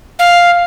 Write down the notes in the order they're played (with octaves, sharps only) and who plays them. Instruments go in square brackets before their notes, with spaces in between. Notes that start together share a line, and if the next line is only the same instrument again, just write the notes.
[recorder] F5